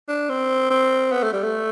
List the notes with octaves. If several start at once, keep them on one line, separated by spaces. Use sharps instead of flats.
D4
C4
C4
B3
A3
G3
A3